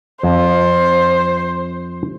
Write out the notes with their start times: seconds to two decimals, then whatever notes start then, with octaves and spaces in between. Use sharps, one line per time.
0.23 F2 C5